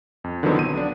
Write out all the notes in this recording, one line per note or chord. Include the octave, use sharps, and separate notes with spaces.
F2
D3 D#3 F3 F#3 B3 C4
B1 D#7
B3 D4